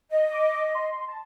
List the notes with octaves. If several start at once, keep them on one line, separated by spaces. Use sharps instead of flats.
D#5
D6
C6
A5